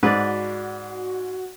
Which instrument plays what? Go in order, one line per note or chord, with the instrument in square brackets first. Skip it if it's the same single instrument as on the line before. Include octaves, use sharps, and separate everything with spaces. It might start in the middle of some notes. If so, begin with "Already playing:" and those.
[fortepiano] G#2 [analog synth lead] F#4 [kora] B4 D5